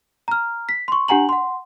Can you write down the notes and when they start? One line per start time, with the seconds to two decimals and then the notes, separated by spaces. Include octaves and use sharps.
0.28 A#5 F6
0.69 B6
0.88 C6 C#6
1.08 D4 G4 F#5 G#5 A#5 F#7
1.29 F#5 C6